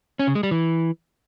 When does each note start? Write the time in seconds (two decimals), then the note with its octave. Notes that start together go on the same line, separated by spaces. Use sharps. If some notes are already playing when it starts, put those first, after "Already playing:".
0.19 C#4
0.27 C#3
0.35 G#3
0.43 G3
0.51 E3